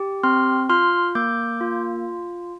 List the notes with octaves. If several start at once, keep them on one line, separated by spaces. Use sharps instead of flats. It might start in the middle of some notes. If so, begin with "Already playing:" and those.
Already playing: G4
C4 C6 F6
F4 C6 F6
A#3 D6 G6
F4